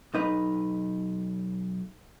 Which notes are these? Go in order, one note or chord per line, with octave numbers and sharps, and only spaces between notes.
B1 D#4 B4